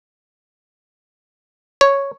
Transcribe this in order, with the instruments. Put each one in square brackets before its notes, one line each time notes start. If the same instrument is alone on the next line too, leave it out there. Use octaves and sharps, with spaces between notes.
[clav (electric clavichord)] C#5